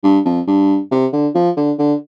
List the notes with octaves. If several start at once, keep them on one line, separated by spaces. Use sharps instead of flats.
G2
F2
G2
C3
D3
F3
D3
D3